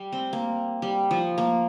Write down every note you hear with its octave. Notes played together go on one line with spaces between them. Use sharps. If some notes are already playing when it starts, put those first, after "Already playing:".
Already playing: G3
C4
A#3
G3
F3
A#3